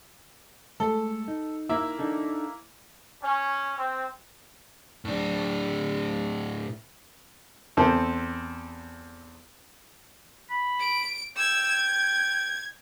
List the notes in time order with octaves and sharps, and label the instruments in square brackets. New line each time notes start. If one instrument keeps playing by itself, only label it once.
[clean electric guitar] G#3 A3 [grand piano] A4
[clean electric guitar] D#4
[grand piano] A#3 E4 E5
[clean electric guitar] D4 D#4 A4
[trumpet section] C#4
C4
[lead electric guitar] A2 D4
[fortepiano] E2 C4 A4
[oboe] B5
[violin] D7
[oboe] G5 [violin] E6 G#6
[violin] G#6